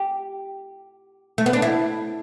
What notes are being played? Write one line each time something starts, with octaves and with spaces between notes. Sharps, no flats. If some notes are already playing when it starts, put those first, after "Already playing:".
Already playing: G4
A3
B3
D4
E4